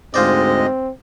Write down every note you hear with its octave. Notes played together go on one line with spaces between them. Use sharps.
D2 G#2 G#3 C4 F4 C5 D5 D#5